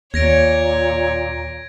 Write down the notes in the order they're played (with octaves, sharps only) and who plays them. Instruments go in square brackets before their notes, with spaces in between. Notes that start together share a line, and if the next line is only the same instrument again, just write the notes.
[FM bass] D#2 [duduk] A#2 [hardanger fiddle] C#5 [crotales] G#6 A#6 D7